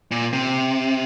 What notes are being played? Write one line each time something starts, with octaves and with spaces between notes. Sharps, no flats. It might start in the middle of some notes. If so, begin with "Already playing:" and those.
A#2
C3